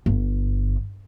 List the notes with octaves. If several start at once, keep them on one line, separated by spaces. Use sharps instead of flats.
G1